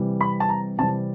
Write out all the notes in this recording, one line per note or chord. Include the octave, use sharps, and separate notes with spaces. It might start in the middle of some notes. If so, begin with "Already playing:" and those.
Already playing: C3 E3 G3
B5
A5
A#5
C3 E3 G3 A5